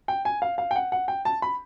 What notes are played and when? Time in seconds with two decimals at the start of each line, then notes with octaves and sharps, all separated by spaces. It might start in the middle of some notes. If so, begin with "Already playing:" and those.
0.08 G5
0.25 G#5
0.42 F5
0.58 F5
0.71 G5
0.76 F#5
0.92 F#5
1.08 G5
1.25 A5
1.42 B5